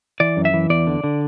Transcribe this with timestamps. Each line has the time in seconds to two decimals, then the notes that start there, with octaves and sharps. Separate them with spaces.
0.20 E3 D5
0.37 F#2
0.45 E5
0.54 E3
0.70 E2 D5
0.87 D3
1.04 D3